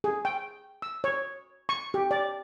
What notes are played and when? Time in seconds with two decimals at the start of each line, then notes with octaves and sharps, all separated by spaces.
0.04 G#4
0.25 G5
0.82 E6
1.04 C#5
1.69 C#6
1.94 G4
2.11 D5